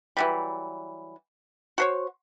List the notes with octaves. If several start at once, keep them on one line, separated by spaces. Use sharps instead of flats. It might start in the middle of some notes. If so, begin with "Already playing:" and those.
E3 F#3 G3
F#4 C5 C#5